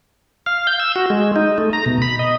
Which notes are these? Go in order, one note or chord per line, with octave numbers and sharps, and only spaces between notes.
F5
G6
E6
F#4
G#3
D#4
A3
A#5
B2
B5
D#5